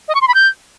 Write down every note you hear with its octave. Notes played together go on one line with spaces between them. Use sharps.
D#5
C#6
C6
B5
G6